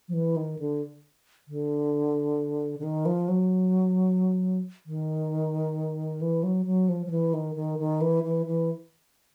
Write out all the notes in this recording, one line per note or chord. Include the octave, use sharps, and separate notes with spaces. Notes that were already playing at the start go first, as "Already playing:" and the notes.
F3
E3
D#3
D3
D3
D3
D#3
F3
F#3
D#3
E3
F#3
F#3
F3
F3
E3
D#3
D#3
D#3
E3
E3
E3